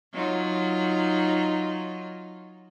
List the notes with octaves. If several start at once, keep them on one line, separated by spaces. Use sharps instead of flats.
F#3 D#4 F4